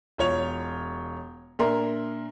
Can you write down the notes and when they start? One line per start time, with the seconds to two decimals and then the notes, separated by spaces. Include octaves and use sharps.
0.18 E1 F4 C#5 F7
1.59 A#2 D4 A#4 E5 A#5 C6